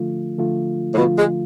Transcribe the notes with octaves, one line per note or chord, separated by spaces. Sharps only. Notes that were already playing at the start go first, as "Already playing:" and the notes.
Already playing: D3 F3 A3 F4
D3 F3 A3 F4
A2
B2 D3 F3 A3 F4
G#3